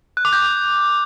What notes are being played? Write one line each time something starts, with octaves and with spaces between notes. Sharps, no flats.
F#6
D6
G6